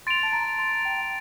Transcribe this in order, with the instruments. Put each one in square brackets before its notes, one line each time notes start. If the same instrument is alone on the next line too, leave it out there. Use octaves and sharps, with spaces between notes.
[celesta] C6 [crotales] A6 D7 F7
[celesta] A5
A#5
C6
G5